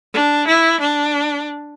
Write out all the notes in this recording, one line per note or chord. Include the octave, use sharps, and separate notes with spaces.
D4
E4
D4